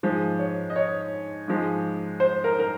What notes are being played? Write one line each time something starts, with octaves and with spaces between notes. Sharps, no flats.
G#2 F3 G#3
C#5
D#5
C#5
G#2 F3 G#3
C5
A#4
A#4